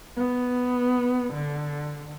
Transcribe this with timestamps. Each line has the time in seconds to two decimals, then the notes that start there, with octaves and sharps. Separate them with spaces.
0.17 B3
1.34 D3